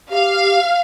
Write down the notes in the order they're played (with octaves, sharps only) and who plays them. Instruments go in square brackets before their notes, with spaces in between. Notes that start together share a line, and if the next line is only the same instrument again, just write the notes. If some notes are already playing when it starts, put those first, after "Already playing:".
[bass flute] G4 [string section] F5